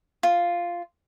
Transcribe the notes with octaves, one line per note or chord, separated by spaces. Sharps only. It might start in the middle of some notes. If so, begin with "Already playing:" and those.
F4